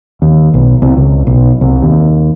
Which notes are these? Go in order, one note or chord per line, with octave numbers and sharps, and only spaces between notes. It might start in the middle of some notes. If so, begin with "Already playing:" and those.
D#2
B1
C2
C#2
B1
C2
D#2